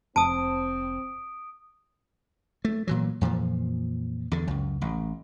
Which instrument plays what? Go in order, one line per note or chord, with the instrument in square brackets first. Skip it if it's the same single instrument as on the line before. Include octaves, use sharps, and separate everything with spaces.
[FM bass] F1 [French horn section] C4 [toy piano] A5 [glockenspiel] D#6 D7
[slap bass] A3
A#2 E3 F#3
F2 A#2 E3 F3
E2 D3
C#2 F#2
A1